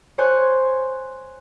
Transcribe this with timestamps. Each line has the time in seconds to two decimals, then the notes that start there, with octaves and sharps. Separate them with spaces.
0.18 C5 C#5 G#5 C6 F#6